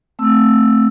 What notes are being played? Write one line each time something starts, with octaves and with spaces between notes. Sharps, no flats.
A3 C4 E6